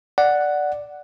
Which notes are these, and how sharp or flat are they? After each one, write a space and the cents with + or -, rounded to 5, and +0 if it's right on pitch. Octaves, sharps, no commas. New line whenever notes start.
D5 +0 F#5 +0